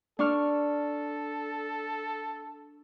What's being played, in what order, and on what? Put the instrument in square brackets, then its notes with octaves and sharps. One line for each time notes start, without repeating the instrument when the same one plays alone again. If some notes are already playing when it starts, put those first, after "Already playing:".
[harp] D4 C#6 F6 [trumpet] A4